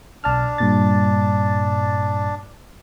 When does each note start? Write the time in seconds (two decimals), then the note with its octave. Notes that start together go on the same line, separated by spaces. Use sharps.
0.24 B1 D4 A5 F6
0.58 G2 A#2 A6